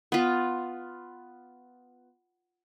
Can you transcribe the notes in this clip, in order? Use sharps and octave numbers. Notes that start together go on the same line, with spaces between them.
B3 F4